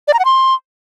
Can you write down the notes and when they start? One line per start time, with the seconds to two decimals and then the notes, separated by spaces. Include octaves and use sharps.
0.08 D5
0.14 A#5
0.19 F#5
0.25 C6